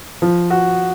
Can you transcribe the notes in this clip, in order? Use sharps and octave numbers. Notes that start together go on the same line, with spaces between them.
F3
F#4